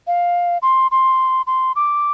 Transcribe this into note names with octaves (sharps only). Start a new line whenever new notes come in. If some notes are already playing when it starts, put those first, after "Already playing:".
F5
C6
C6
C6
D6